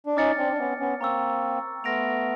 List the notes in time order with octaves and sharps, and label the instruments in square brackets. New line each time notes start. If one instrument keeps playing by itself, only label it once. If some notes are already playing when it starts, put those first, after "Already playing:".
[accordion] D4
[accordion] C#4 D#4 [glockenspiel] D6 F6 A6 C#7
[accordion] C4 D4
D4
B3 C#4
B3 C#4
[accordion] A#3 C4 [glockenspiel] A#5 C#6 E6
[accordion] A3 B3 [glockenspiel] C6 F6 A#6 D7 F7